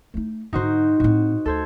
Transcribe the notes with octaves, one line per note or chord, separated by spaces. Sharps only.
A3 D#4
G#2 D3 D#4 F#4 C5
A2 C4 F#4
D2 A4 C5 G#6